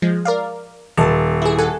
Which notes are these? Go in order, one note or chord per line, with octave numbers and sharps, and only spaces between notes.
F3 G#3
A#4 D5 F5
D#1 A5
E4 G#4
A4 F#5 G#5